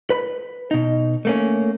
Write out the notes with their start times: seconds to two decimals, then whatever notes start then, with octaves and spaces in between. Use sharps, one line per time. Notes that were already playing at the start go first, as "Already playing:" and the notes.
0.10 B4 B5
0.71 B2 D#4
1.25 A3 A#3 C#4